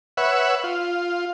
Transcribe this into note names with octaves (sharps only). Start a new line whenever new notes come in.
B4 C#5 E5 F#5
F4